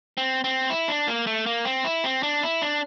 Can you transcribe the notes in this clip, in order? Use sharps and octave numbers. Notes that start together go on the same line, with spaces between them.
C4
C4
E4
D4
A#3
A3
A#3
C4
E4
C4
D4
E4
D4